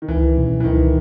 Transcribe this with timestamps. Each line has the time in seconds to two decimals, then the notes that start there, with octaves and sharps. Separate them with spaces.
0.02 D#3
0.08 C#2 E3
0.36 B2 F#3 C#4
0.60 E3
0.64 C#2 D#3